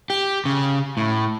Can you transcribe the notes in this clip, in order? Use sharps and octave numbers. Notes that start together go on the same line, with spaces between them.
G4
C#3
A2